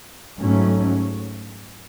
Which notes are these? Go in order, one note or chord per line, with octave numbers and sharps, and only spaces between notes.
G#2 F#3 A3 C#4